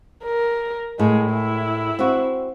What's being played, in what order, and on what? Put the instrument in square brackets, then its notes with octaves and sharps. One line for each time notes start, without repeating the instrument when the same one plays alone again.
[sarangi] A#4
[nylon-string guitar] A2 [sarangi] G#3
[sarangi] E4
[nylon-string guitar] C4 F#4